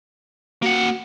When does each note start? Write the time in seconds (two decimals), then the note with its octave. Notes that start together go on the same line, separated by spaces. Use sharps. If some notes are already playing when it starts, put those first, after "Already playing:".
0.62 A#3 F#4 F#5